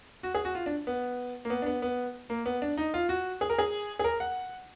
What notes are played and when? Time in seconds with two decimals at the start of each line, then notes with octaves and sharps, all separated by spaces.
0.23 F#4
0.35 G#4
0.45 F#4
0.55 F4
0.66 D4
0.87 B3
1.45 A#3
1.50 B3
1.62 D4
1.66 B3
1.82 B3
2.30 A#3
2.46 B3
2.62 D4
2.77 D#4
2.94 F4
3.09 F#4
3.41 G#4
3.50 A#4
3.58 G#4
3.99 G#4
4.04 A#4
4.20 F#5